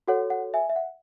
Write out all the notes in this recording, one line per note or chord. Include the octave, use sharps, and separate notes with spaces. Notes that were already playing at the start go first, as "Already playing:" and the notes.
F#4 A4 C#5 F#5
F#5
E5 G#5
E5
F#5